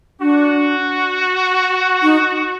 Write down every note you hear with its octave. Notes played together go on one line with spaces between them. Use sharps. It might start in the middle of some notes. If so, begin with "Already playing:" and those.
D4 F#4
D#4